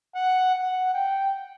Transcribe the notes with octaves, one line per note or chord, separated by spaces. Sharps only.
F#5
F#5
G5